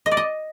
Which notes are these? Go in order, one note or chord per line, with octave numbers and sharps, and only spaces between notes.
D#5
D5
D#5